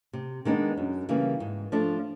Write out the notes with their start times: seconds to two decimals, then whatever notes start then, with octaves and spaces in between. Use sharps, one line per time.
0.13 C3
0.45 D#3 G#3 B3 D4
0.77 F#2
1.09 C#3 E3 G3 A#3
1.40 G#2
1.72 F3 A3 D4 F4